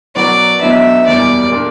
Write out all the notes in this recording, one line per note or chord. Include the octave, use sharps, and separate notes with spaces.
B2 F#3 B3 F#4 A#4 D5
B1 B2 F#3 B3 D4 E5
F#1 E2 B2 G3 A#3 D5
A#2 A#3 D4